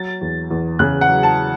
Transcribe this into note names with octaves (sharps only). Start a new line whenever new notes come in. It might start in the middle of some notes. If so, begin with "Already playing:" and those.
Already playing: F#3 A6
E2
E2
C#3 F#6
F#5
F#3
A5